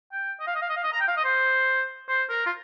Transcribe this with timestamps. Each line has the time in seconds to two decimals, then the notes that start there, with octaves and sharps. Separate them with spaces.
0.12 G5
0.40 D#5
0.47 F5
0.55 D#5
0.62 F5
0.69 D#5
0.76 F5
0.84 D#5
0.93 A#5
1.00 G5
1.08 F5
1.17 D#5
1.24 C5
2.09 C5
2.30 A#4
2.46 F4